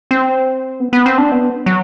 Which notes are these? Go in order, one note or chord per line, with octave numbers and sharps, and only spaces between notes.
C4
B3
B3
C4
D4
B3
F#3